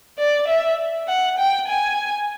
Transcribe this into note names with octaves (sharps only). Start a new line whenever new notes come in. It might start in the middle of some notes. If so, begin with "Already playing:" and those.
D5
E5
F#5
G5
G#5